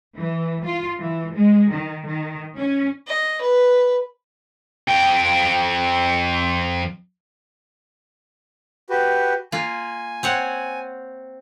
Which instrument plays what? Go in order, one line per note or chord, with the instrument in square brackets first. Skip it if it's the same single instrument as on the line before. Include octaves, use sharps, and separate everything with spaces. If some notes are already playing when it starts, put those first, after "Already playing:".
[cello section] E3
F4
E3
G#3
D#3
D#3
C#4
[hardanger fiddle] D#5
B4
[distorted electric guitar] F2 G5
[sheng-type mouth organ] F#4 G4 B4
[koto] A#3 F4 [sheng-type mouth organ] G#5
[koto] C4 C#5 F#5